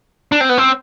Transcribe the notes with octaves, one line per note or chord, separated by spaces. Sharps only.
D4
C4
B3
C4